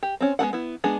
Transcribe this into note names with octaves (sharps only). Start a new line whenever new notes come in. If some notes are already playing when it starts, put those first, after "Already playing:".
G4
C4 C#4
G#3 B3 D4 F#5
B3 E4
G#3 B3 D4 G#4